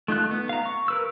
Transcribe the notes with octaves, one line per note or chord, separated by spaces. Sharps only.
A3 D#4 F4 F#6
B3
F5 A#5
C#6
A#4 B4 E6